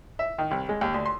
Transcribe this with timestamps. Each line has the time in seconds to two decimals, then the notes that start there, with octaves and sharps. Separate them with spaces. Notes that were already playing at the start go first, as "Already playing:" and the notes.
0.19 E5
0.38 D#3
0.51 C2
0.69 G#3
0.81 D#2
0.94 D2
1.06 C6